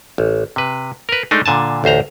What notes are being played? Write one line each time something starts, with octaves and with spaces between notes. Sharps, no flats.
A1
C3 B4
A#4 B4
G#3 A3 D4 D#4
A#2 D3 G#5 A5
A1 D2 C5 A#5